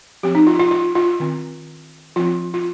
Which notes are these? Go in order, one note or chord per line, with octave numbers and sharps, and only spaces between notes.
F3 C4 G4
D#4
F4
F4
F4
F4
D#3 C4
F3 C4 F4
F4